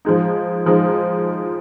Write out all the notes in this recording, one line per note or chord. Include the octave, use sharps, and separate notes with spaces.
F3 G#3 D#4
F3 G#3 D#4